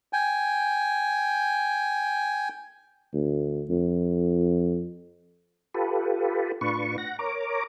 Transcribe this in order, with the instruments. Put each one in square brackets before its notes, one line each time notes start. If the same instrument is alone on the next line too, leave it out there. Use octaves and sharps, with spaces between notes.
[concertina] G5 G#5
[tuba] D2
F2
[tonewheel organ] F4 G4 A4 B4
A2 D4 F4 B4 C#6
F#5 A#6
A#4 C#5 A#5 D6